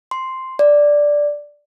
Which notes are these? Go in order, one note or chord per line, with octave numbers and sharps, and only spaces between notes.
C6
D5